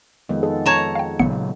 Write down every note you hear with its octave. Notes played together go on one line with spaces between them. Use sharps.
F2 D#3 G#3 B3
G#4 A4
C#5 A5 A#5
F5 G5
A1 A#2 C#3 F#3 B3 C#7